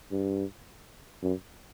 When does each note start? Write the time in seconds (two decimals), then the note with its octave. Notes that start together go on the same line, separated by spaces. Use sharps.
0.11 G2
1.22 F#2